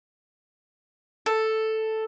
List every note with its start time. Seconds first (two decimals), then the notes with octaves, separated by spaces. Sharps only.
1.26 A4